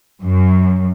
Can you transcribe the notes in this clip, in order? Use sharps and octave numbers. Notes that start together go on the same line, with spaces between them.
F#2